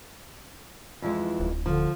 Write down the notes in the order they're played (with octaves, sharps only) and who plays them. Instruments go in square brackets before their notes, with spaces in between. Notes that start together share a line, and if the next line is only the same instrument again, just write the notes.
[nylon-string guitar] F2 E3 G#3
[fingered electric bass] D1
[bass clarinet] D3 [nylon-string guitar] F3